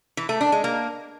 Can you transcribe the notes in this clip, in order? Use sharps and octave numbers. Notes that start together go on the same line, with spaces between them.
E3
A3
D4
G#3
A#3